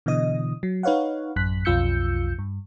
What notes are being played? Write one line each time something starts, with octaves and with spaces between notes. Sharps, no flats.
B2 D3 E3 D#5 D#6
F#3
D#4 B4 C#5 F5 F#5
A1 F#2 F#6 B6
B1 F2 F4 E6 G6 C#7
G2